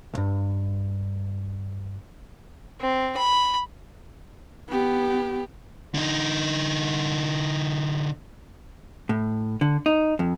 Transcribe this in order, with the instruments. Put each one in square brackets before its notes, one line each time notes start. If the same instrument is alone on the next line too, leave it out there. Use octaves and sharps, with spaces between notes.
[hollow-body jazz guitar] B1 G2
[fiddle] C4
B5
[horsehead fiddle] B3 G4
[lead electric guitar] D3 D#4
[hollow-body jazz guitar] A2
D3
D#4
F2